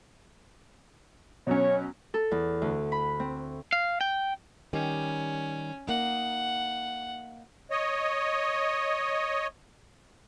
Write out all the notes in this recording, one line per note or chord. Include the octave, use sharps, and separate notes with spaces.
B2 F#3 C#4 C#5
A4
E2
D2
B5
C4
F5
G5
D#3 G3 C#4 G4
A#3 D#4 F#5
C#5 D#5